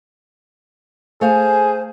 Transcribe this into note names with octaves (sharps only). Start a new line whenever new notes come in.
A3 G#4 C5 F5 G#5